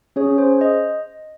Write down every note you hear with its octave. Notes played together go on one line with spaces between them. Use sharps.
C#4 G#4 C#5
C5
D#5